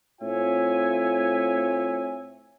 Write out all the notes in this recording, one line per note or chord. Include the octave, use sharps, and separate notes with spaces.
A2 C4 F4 C#5 E5 G#5